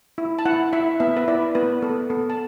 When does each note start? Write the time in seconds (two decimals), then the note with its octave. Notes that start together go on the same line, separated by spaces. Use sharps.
0.18 E4
0.39 A5
0.45 E4 F#5
0.73 E4 E5
1.00 B3 E5
1.17 B4
1.28 E4 D5
1.55 B3 B4
1.82 B3 A4
2.10 B3 A4
2.30 A5